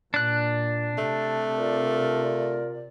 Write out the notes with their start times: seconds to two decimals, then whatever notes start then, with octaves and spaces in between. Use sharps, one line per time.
0.14 A#2 D4 F#6
0.98 C3 A3
1.57 F4 A#4 D5